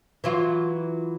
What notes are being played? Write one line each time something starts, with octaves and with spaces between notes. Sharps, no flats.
E3 F#3 F4